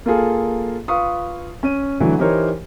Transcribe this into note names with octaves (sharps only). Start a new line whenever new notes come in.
A#3 F4 G#4 A4
F4 B4 F5 C#6 D#6
C#4 D#7
D3 E3 F#3 A3
E3 D#4 G4 A#4 C5 C#5